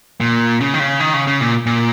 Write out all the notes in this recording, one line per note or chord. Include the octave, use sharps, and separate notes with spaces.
A#2
C#3
D#3
C#3
D#3
C#3
C#3
A#2
A#2